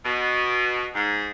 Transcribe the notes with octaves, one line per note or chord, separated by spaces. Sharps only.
B2
G#2